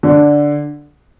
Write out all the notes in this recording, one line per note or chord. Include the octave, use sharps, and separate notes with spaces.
D3